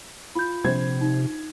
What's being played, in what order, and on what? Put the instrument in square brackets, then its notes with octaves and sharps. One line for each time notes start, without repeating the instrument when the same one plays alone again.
[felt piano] F4 [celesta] B5 G6
[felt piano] A#1 C5 G#6 [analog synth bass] C3
[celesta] D#4